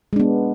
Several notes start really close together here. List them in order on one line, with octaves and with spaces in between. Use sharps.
G#3 D4 B3